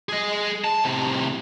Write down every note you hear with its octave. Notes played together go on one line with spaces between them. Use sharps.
G#4 D#5
A5
A2 C3